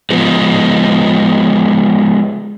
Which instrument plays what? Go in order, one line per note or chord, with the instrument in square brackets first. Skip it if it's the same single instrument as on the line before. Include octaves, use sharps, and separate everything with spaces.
[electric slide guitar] F3 G#3 B3